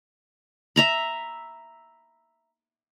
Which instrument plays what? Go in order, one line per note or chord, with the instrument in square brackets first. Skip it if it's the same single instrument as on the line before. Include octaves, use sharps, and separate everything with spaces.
[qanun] E5 A#5 B5